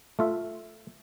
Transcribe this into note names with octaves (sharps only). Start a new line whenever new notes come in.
A3 F4 E5